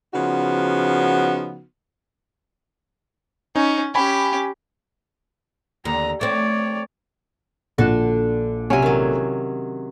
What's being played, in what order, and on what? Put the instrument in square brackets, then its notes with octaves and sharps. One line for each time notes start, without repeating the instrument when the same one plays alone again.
[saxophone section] C#3 F3 B3 D#4 F#4
[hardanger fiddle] C#4 [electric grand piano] D#4
[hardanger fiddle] C#4 G4 [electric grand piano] G#5 B5
[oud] D#2 D3 [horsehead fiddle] A#5
[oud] A3 C4 [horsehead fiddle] C#5 D5
[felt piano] A#1 [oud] D3 F#4 A4
[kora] C3 C#4 [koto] F#3 G#5
[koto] D#3 F#3